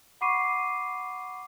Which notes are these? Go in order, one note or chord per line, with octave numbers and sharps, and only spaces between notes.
F#5 B5 C#6 D6 C7 D#7